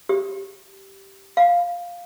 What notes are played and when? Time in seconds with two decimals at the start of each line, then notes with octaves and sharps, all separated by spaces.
0.09 G4
1.37 F5